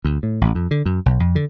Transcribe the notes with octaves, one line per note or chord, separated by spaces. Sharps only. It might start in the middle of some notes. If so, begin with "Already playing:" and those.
D2
A2
A1
F2
D3
F#2
B1
F2
D3